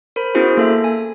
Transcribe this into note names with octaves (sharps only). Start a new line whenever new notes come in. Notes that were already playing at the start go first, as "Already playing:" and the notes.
A#4 C5 B5
B3 C#4 E4 F#4 G#4 C5
A#3 A4 E5
G#5